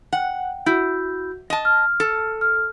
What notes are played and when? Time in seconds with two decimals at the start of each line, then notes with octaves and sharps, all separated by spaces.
0.13 F#5 G5
0.66 E4 F#4 G6
1.50 D#5 A5
1.65 F6
2.00 A4
2.41 F6